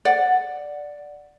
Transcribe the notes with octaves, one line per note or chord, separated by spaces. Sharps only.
D5 F#5